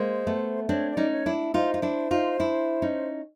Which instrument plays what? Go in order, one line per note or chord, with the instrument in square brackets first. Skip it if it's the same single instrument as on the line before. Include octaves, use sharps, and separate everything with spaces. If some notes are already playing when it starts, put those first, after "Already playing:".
Already playing: [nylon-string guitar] G#3 A#3 [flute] C5
[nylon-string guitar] A3 B3
[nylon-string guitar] C4 D4 [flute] C#5
[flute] D5
[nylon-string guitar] C#4 D#4
[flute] C#5
[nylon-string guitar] D4 E4
[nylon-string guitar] D#4 F4 [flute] C5
[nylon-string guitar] F4
D4 E4
D#4 F4
D4 E4
C#4 D#4